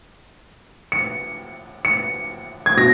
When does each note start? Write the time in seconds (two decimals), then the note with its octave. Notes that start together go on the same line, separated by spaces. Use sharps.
0.92 C#7
1.85 C#7
2.66 G#6
2.77 B2 A#6